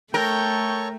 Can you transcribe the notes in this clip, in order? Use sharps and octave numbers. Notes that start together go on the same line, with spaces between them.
A3 A4 A#4 C#5 G5 C#6